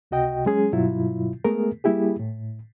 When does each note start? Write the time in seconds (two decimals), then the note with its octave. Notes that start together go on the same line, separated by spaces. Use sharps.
0.11 C#2 C3 F#4 D#5 G5
0.46 F#3 G#3 C#4 G#4
0.73 G2 B2 F#3 E4 F4
1.44 G#3 A3 B3 G#4 A#4
1.84 G3 A#3 E4 G4 G#4
2.19 A2